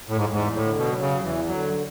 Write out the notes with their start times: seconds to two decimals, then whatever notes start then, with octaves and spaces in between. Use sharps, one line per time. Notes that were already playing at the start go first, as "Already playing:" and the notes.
0.09 A2
0.17 G#2
0.24 E2
0.33 G#2
0.55 A2 D3
0.78 B2
0.86 F#3
1.01 C#3
1.17 E2
1.24 E3
1.48 D3 F#3